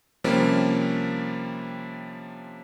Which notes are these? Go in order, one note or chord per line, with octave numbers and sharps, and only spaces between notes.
C3 F3 G3 A#3 C#4